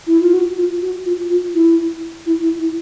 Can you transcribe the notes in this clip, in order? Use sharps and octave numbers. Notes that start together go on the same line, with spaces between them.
E4
F4
F#4
F4
F#4
F4
F4
E4
E4
E4
E4